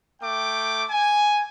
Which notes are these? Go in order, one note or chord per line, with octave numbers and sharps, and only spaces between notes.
A3 G5 D6
G#5